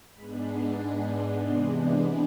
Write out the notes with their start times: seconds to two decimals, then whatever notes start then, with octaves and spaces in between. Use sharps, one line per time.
0.13 G#2 G#3 B3 D4 B5
0.46 C6
1.10 C6
1.42 C3 E3 G#3 B3 D4 C6
1.73 B5